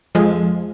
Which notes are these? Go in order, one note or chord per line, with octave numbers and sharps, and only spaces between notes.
F2 F3 G#3